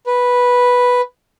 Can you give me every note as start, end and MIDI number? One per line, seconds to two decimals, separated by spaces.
0.07 1.01 71